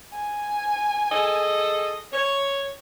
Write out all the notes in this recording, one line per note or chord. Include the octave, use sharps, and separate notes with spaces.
G#5
G#4 A4 D#5
C#5